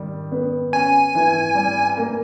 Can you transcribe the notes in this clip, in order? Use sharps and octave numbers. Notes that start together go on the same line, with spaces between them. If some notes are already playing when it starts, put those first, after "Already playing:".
Already playing: D#3 G3
B3
C#4 G#5
E3
G3
A#3